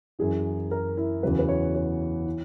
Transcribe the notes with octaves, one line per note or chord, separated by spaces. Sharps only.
F#2 E3 G#4
A#4
E4
E2 C#3 F#3 B4
B4
C#5
C#5
E3